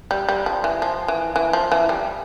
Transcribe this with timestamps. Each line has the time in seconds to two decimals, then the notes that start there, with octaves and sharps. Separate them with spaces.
0.11 G3
0.29 G3
0.46 F3
0.64 E3
0.82 F3
1.08 E3
1.36 E3
1.53 F3
1.72 E3
1.89 G3